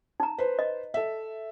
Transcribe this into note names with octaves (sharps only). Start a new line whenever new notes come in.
D#4 A#5
B4 C5
D#5
A4 E5